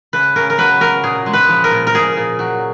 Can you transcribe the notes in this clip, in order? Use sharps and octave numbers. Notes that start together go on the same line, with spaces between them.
C#3 B4
C#3 A#4
A#4
F#3 B4
F#3 A#4
A#2 G#4
G#3
B4
F3
A#4
A#2
A#4
A#2 G#4
A#2
F#3